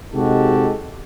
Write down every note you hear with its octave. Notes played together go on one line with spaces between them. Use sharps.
C3 G#3 D#4 F#4 G4 A4